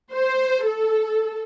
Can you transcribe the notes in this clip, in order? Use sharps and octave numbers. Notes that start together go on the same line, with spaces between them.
C5
A4